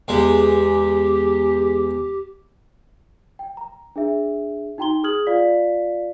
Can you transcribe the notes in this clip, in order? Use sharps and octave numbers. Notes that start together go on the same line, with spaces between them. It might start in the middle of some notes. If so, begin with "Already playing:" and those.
E2 G#3 G4
G5
A#5
D4 G#4 E5
D#4 F#4 G5 A#5 C6 G7
G#4 D#6 F6 G#6 F#7
F4 D5 F5 B6